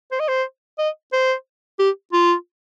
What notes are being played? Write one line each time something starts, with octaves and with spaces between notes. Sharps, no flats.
C5
D#5
C5
D#5
C5
G4
F4